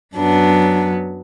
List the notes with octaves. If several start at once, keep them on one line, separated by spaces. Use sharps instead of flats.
F#2 F#3 B3 D4